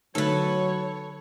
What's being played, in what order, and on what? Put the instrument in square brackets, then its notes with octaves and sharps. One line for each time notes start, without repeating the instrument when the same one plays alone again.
[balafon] D3 A3 D#4 [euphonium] F#3 [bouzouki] A4 B4 [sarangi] C#5